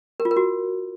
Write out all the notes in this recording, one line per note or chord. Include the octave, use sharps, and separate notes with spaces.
A#4
F4
A#4
F#4